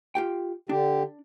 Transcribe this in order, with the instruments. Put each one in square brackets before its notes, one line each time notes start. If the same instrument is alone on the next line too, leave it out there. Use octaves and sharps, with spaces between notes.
[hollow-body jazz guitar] F4 G4 G5
[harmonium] D3 G4 [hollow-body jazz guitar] D4